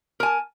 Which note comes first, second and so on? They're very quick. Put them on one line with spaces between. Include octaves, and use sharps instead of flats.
A#4 G#5 A5